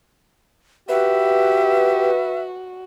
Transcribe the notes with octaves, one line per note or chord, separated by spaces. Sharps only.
F#4 G4 B4 E5